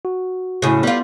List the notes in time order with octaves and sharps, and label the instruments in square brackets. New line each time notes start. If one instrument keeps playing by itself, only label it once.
[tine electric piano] F#4
[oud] A2 C#3
[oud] G3 F4 [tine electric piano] B3